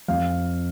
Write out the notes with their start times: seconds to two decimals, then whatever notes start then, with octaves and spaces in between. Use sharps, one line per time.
0.08 F2 F5